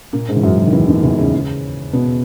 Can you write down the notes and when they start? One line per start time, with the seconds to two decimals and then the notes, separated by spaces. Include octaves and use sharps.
0.13 A#2 A#3
0.28 G#2 G#3
0.36 E3
0.43 F#2 F#3
0.58 F#2 F#3
0.66 D#3
0.73 E2 E3
0.88 D#2 D#3
1.03 E2 E3
1.18 C#3 C#4
1.93 B2 B3